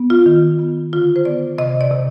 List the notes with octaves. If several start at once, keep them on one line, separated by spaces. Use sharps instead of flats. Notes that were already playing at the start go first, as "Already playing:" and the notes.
Already playing: B3
F4
D#3
B3
D3 F4
C5
B3 D5
C3 D#5
D5
C3